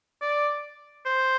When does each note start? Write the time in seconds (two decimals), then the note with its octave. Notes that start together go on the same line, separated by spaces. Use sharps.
0.21 D5
1.06 C5